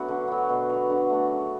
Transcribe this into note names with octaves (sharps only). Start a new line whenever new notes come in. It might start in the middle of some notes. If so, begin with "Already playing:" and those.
Already playing: F#3 A3 B3 D4 F#4 B4
D3
F#3 B3
B2
F#3 B3
D3
A3 D4 F#4
C#3